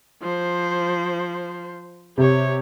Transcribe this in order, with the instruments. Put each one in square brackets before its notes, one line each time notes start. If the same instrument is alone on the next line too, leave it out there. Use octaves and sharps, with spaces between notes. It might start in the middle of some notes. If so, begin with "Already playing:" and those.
[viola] F3 C5
[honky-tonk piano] C3 [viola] G4 C#5